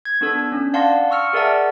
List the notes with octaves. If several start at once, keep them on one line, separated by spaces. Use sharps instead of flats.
G#6
B3 D4 A4 E6
C#4 D4
D5 F5 F#5 A5 C6 A#6
C#6 E6 F6 C#7
G#4 A#4 D5 E5 F#5 A5